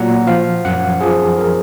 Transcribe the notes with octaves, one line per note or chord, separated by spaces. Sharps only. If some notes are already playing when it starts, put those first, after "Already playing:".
Already playing: A#2 F#3 F#5 A#5
F3 F5
F#2 F#5
F3 G#4
A#4